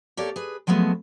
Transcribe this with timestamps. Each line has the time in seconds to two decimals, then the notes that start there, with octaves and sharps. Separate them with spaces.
0.17 A#3 G4 A4 C#5 D5
0.36 G#4 B4
0.67 F3 F#3 G#3 A3 B3